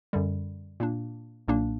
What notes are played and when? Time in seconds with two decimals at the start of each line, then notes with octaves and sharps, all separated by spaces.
0.13 F#2 D3 G3
0.80 A#2 A#3 D4
1.48 B1 A#2 A#3 D4